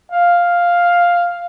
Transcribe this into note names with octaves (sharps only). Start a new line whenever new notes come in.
F5